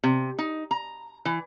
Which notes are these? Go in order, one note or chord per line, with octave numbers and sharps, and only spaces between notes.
C3
D#4
A#5
E3